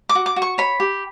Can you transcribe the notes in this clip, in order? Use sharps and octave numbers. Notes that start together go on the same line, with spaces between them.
D6
F#4
D6
F#4
C#6
C#5 B5
G4